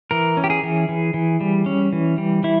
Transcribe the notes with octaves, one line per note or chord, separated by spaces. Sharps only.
E3 A#4
C#4
G4
G#4
E3
E3
E3
G3
C#4
E3
G3
E3 E4